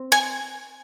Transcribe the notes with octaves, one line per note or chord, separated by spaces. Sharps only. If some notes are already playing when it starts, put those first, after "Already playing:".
Already playing: C4
G#5